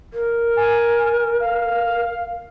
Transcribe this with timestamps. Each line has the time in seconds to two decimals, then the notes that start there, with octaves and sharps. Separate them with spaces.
0.14 A#4
0.56 G#5
1.40 F5